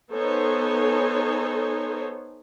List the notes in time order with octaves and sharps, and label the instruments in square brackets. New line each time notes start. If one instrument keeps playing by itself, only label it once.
[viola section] B3 D#4 A4 C5 C#5 G#5